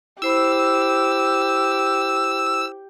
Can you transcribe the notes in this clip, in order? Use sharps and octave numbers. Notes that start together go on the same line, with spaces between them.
E4 G4 C5 B5 E6